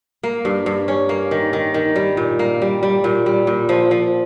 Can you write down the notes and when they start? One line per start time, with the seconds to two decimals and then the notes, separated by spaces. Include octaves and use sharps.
0.23 A#3
0.45 G2
0.66 G2
0.88 C#4
1.09 A#3
1.31 D#3
1.53 D#3
1.74 D#3
1.96 G3
2.17 A#2
2.39 A#3
2.62 G3
2.83 G3
3.04 A#2
3.26 G3
3.47 A#2
3.69 F3
3.91 F3